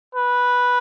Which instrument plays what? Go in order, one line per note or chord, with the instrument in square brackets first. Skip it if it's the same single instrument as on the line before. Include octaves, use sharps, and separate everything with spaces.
[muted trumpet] B4